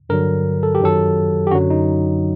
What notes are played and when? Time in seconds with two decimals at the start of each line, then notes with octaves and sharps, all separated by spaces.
0.09 G2 D3 F#3 A#4
0.63 A4
0.75 G4
0.80 F#2 D#3 F#3 A4
1.47 G4
1.51 F#2 D3 F#3 F#4
1.70 D#4